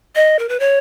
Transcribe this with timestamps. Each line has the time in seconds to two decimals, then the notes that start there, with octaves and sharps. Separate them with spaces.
0.15 D#5
0.39 A#4
0.49 B4
0.60 C#5